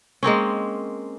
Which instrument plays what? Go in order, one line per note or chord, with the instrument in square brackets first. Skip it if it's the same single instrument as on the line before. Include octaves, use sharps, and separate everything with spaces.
[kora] G#3 A#3 C4 C#4